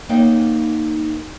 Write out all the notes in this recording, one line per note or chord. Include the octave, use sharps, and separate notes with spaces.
A#3 D#4 C#5 F#5 G5